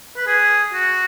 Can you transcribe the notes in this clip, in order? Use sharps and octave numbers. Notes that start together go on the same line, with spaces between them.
B4
G#4
F#4